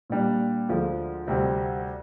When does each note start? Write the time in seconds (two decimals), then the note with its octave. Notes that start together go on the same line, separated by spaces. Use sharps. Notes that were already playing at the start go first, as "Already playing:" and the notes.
0.10 A#2 G3 D4
0.69 D2 D3 F3 G#3
1.27 D2 C3 G3 C4